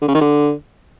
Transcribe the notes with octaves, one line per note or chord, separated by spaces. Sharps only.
D3
C#3
D#3
D3